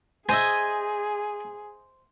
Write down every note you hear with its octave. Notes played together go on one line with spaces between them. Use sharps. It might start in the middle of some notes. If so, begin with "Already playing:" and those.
G#4 C5 D#5 E5 G#5